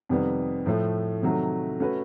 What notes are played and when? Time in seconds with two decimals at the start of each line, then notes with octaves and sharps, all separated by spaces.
0.09 F2 C3 D#3 G3 B3
0.66 A2 F3 A3
1.23 C3 D#3 F#3 A3
1.80 A3 C#4 F#4 B4